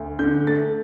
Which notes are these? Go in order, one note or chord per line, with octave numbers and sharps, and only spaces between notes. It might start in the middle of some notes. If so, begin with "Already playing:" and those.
Already playing: D2
D3 G6
A3 A6